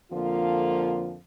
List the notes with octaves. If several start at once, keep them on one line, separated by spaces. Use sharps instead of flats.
F2 D3 F3 A#3 F4